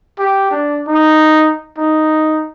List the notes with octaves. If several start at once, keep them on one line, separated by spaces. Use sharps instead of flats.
G4
D4
D#4
D#4